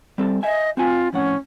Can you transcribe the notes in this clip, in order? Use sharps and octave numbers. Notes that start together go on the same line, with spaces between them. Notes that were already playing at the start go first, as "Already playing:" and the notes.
G3 C4 A4
D#5 E5 G#5
C4 F4 F#4 G#5
F2 A2 C#4 F#5